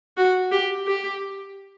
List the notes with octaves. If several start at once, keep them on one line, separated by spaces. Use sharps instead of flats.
F#4
G4
G4